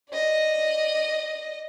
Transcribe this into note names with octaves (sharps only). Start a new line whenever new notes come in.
D5 D#5